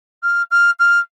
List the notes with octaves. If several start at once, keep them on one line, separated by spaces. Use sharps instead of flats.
F6
F6
F6